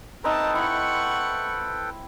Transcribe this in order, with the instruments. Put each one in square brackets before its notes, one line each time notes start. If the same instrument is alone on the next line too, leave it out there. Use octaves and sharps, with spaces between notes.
[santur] C4 D#4 E5 [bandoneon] A4 B4 G5 [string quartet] A5 A#5
[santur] E4 [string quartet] F#5 C#6